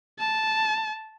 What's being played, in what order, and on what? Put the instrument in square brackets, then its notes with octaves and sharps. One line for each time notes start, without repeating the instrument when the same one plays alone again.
[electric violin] A5